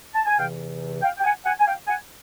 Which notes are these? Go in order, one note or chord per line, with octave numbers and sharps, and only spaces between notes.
A5
G#5
E2 C3 E3 F5 G5
F5 G5
G5
F#5 G#5
F#5 G#5
G#5
F5 G5
F#5 G#5